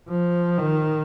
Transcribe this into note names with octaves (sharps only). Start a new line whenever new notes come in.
F3
D#3